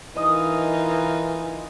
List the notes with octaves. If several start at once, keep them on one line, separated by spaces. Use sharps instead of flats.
E3 D#4 F4 A#4 D#5